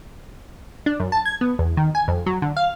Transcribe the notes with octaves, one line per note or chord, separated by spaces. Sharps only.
D4
F#2
A5
G#6
B3
E2
D#3
G#5
F2
F#3
D3
F5